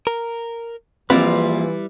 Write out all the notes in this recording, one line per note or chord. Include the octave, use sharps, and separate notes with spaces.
A#4
A#1 E3 G3 C4 E4 F4 B4 D5